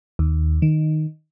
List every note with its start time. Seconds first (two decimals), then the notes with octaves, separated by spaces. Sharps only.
0.19 D#2
0.62 D#3